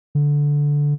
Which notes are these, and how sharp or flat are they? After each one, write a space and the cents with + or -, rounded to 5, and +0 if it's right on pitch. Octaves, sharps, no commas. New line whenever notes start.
D3 -10